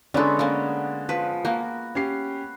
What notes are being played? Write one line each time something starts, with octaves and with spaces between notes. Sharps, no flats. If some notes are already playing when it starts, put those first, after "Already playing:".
D3 G#3 B3 C#4 D4 F#4 A4 D5
A#3 C#4
F3 B4
A#3 F#4
C#4 G4 C7